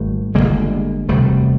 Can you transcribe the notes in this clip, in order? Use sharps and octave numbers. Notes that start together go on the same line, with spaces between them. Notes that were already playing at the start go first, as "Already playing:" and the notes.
Already playing: G#1 G3 A3
G1 F2 D3 G#3 A#3
E1 D2 C3 G3 A3